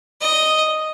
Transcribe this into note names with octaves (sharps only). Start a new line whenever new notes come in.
D#5